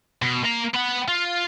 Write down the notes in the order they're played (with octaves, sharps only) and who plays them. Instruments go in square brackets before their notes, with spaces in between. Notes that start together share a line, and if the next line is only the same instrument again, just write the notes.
[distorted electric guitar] B2
A#3 A#5
B3 F#5
F4